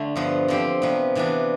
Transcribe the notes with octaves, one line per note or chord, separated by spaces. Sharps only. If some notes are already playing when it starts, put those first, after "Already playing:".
Already playing: D3 A3 G4
G2 F3 B3
D3 F3 C4 G4
C3 F3 B3
C3 E3 B3 D4